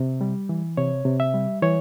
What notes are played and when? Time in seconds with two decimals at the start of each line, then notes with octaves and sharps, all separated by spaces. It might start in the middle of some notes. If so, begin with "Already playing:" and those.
Already playing: C3
0.21 G3
0.49 E3
0.77 C3 C#5
1.05 C3
1.20 E5
1.34 G3
1.62 E3 C#5